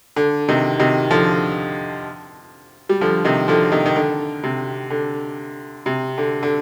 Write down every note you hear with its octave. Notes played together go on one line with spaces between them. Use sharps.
D3
C3 D#3
C3 D#3
D3 F3
G3
D3 F3
C3 D#3
D3 F3
C3 D#3
D#3
D3
C3
D3
C3
D3
D3